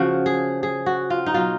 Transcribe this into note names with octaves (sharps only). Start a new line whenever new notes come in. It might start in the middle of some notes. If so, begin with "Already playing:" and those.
Already playing: C#3 F3 F#4
G#4
G#4
F#4
F4
D#4
B2 F#3 F4